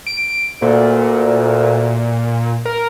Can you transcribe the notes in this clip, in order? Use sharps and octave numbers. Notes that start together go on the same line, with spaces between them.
D7
D2 A#2
A#4